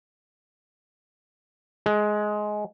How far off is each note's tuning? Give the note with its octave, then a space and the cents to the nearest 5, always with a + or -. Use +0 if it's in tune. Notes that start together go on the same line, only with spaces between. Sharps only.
G#3 +15